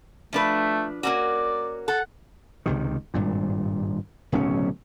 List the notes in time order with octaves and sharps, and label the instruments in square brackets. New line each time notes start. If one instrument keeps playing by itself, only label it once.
[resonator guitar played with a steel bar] F3 D4 B4 [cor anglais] A3
[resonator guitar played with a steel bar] A#3 C#4 F#4 [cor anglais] D5
[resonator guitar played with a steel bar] A4 [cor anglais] F#5
[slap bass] C#2 C3 D#3
G#1 G2 A#2
D1 B1 C#3 C#4